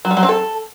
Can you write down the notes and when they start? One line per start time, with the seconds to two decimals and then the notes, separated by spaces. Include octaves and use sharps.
0.05 F#3
0.11 G3
0.17 F#3
0.23 C4
0.29 A4